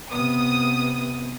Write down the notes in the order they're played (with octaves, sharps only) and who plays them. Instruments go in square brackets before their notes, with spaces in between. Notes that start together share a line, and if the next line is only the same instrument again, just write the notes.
[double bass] C3 B3 [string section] D#6